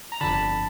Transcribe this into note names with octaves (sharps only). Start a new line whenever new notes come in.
A#5
G1 F2 D3 A5 B5